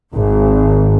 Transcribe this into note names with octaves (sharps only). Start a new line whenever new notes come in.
G#1